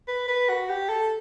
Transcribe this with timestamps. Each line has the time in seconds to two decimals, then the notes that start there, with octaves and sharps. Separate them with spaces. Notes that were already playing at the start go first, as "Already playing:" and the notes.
0.08 B4
0.28 B4
0.49 F#4
0.69 G4
0.89 A4